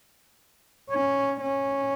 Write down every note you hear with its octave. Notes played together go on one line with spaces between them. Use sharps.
C#4
C#4